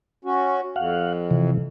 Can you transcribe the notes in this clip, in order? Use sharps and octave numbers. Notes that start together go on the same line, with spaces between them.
C#4 F#4
F2 F5 F#5
C3 E3